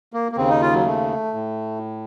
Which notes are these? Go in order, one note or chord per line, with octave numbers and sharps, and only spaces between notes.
A#3
A#3
D#2 C#3 C4
D#4
F4
F#3
A3
A2